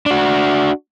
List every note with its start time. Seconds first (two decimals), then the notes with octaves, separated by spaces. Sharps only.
0.06 D4 F#4